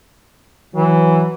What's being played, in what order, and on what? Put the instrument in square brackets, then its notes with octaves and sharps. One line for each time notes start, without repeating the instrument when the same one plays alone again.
[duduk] E3 [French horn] F#3